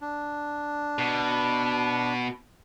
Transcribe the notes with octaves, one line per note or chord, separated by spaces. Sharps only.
D4
B2